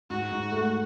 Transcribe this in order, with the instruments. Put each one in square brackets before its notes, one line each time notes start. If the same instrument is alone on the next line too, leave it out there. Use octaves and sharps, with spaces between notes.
[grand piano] G#2 [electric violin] F#4
[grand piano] G#2
A3